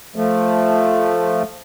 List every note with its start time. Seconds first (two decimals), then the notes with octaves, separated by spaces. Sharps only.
0.16 F3 A3